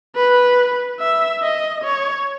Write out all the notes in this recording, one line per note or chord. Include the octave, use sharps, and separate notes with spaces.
B4
E5
D#5
C#5